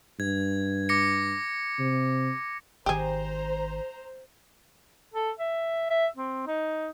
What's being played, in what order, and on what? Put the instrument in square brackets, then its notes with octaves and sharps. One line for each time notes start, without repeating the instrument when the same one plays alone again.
[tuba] G2 [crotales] G#6
[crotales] D6 A#6 C#7
[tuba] C3
[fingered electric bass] G#1 D#3 [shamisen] G4 G#4 [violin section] C5 A#5
[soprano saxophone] A4
E5
E5
C4
D#4